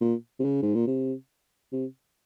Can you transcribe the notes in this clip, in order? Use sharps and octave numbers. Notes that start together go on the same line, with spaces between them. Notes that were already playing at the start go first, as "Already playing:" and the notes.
A#2
C3
C#3
G#2
A#2
C3
C3